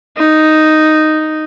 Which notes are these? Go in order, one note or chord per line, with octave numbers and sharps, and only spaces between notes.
D#4